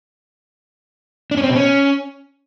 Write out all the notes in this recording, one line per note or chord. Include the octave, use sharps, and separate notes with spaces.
D4
C#4
C4
B2
C#4